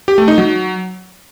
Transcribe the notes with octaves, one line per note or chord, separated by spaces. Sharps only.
G4
A3
D#4
F#3